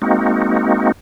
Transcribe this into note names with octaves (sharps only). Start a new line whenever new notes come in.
G#3 A#3 C4 D#4 F#4